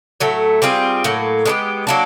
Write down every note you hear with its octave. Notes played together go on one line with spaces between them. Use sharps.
A2 F#3 A3
G3 C4 F4 G#4
A2 F#3 A#3
G#3 B3 D4 G4
F#3 A#3 D4